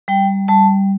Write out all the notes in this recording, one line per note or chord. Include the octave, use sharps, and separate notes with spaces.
G3 G5
G3 A5